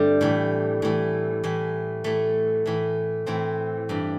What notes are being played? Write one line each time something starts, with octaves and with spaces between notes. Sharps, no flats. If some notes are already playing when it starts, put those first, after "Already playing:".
Already playing: G2 D3 G3 A3 C4
A2 E3
A2 E3
A2 E3
A2 E3 A3
A2 E3
A2 E3 C4
G2 E3